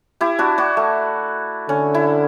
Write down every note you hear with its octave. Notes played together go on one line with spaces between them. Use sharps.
E4 G4
D4 F#4
D4 F#4
A3
D3 C#4
E4